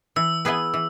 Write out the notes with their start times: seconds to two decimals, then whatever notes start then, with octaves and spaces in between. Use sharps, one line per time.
0.16 E3 E6
0.45 B3 E4 G#4 B4
0.74 E3